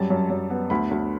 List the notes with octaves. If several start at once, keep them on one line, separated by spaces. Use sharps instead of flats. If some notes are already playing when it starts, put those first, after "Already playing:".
Already playing: F#2 G3 A5
F#2
F#2
B3
D2 B5
D2